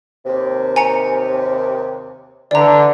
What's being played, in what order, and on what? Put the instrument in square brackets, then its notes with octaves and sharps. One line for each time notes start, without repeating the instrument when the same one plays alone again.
[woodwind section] D#2 C3
[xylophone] G#5 A#5 C#7
[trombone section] D3 [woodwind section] E3 [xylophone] D5 A#5